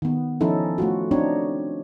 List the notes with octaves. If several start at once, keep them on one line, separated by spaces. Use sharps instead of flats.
D#3 B3
F3 C#4 D#4 E4 A4
A3 F4 F#4
C4 D4 D#4 C#5